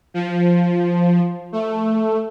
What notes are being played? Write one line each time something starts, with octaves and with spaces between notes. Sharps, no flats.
F3
A3